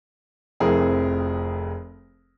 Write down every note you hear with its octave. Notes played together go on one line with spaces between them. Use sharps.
F1 F2 C4 E4 G#4 A#4